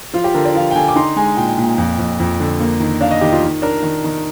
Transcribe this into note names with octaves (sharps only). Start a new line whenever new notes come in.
F3 F4
G4
D3 A#4
D5
F3 F5
G5
D3 G#5
D6
D#4 C6
G#3 G#5
A#2 G5
A#2
F2
F2
F2
D3
A#3
D#3
D4 F5
D#5
D#3 G4
F4
D#3
D4 A#4
D#3
D#3